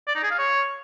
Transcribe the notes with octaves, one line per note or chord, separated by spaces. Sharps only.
D5
D#4
G#4
F5
C#5